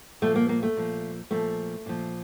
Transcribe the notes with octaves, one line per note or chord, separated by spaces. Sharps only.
A#2 F3 A3
A#3
A#3
A3
A#2 F3
A#2 F3 A3
A#2 F3